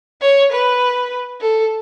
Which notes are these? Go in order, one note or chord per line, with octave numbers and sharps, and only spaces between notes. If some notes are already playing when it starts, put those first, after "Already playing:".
C#5
B4
A4